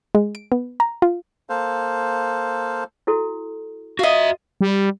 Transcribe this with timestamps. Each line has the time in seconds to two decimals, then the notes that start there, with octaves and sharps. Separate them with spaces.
0.15 G#3
0.35 D7
0.52 B3
0.80 A#5
1.02 F4
1.49 A#3 A4 C5 F5
3.07 E4 F#4 A4
3.99 F4 F#4 D#5 E5
4.61 G3